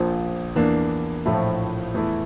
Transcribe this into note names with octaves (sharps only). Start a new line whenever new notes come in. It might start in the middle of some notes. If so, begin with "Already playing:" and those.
Already playing: A#1 A#2 F3
E2 E3 A#3 D4
A#1 A2 F3 A3 E4
E2 E3 A3 E4